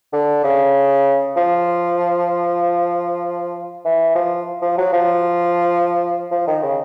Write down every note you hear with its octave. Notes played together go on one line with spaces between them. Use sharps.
D3
C#3
F3
E3
F3
F3
F#3
F3
F3
D#3
C#3